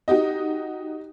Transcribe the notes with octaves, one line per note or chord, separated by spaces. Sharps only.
D#4 F#4 G4 D#5